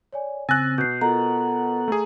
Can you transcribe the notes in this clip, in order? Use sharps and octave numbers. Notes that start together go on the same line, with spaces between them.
C#5 D5 G#5
C#3 C4 G#5 E6 F#6 A6 A#6
B2 G6 C7
B3 F4 A4 A#4 D#5 F#5 A#5
A3 G#4